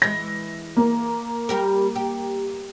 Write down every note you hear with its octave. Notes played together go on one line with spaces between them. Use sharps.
E3 G#3 A#6
A#3
G3 G4 A#4
G4